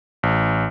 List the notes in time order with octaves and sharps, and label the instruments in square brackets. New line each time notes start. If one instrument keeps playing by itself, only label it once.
[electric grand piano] A1